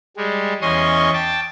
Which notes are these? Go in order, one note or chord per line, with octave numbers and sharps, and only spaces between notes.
G3 G#3
E2 C#4 D#5 C6 C#6 D#6
G5 A5 D6